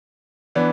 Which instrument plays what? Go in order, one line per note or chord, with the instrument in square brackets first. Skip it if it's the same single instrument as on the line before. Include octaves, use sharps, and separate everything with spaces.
[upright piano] E3 B3 D4